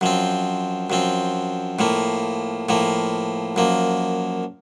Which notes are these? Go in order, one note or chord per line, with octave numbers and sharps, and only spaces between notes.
F#2 F3 C4
F#2 F3 C4
A2 F3 A#3
A2 F3 A#3
F#2 F3 A#3